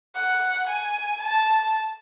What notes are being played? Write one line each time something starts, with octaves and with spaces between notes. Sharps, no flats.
F#5
G#5
A5